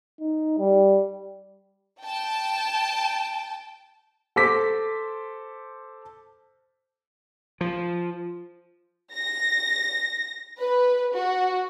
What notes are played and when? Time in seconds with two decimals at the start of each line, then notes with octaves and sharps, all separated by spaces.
0.20 D#4
0.58 G3
2.04 G5 A5
4.36 A4 C5 D6 B6
7.61 F3
9.15 A#6
10.59 B4
11.15 F#4